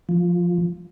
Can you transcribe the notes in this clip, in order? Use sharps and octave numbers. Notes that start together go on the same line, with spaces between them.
F3